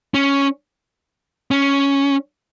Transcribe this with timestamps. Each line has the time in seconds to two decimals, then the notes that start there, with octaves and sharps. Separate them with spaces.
0.14 C#4
1.51 C#4